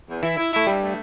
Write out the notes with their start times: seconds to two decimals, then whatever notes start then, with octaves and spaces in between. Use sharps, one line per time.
0.08 E2
0.22 E3 E4
0.37 E4
0.52 A3 E4
0.67 G2 G3
0.82 A3